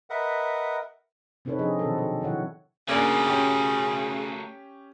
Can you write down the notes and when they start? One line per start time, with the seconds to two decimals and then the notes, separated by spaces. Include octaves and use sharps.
0.10 A#4 B4 D#5 E5 F#5
1.45 C3 C4 D#4 A4 B4 C#5
1.58 C3 F3 C4 D4 G#4 D#5
1.79 B2 D#3 F#3 C4 A4
1.98 A4
2.21 C3 D#3 F#3 E4 C#5 F#5
2.89 C#3 A3 A#3 D4 F#4 A#4 G#5
3.27 C#4 G4